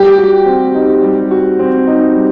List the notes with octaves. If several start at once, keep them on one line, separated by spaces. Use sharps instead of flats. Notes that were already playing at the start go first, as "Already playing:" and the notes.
Already playing: G3 G4
F#4
C4
D#4
G3
F#4
C4
D#4
G3